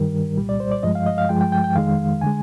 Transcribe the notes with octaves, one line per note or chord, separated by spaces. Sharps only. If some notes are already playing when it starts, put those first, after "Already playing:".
Already playing: G2 D#3 G3 A#4
C2 A#2 G3
D5
C5
D5
G2 F3 G#3 D#5
F5
D#5
F5
G2 F3 G#3 G5
G5
G5
G5
F2 D#3 G#3 F5
D3 G#3 G#5